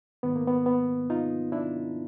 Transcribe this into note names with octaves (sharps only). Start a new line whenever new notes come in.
G#2 D#3 B3
A#3
B3
B3
D#4 F4
D4 E4